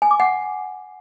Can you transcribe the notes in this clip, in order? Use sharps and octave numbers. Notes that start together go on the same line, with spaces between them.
G#5
D6
F#5